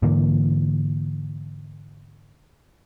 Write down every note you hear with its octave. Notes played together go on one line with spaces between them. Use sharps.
G#2 D3 E3 A#3